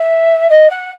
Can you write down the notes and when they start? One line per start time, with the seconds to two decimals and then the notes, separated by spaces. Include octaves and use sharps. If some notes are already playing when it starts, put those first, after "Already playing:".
Already playing: E5
0.50 D#5
0.70 F#5